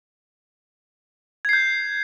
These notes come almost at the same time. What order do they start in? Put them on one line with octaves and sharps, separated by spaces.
G#6 C7 G6